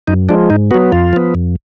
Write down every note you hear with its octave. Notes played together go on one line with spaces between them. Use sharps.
F#2 D#4
F3 G#3 D4
G#2 D#4
F#3 B3 F#4
F2 F4
F3 B3
F2